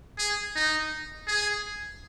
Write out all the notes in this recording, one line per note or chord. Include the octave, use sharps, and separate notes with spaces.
G#4
D#4
G#4